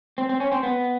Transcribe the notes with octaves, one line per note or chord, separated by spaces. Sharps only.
C4
C4
C#4
C4
B3